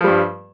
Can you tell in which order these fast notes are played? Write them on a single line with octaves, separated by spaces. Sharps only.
F3 G3 G2